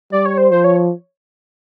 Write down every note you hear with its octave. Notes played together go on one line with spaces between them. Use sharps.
G3 D5
C#5
C5
F3 C5
C#5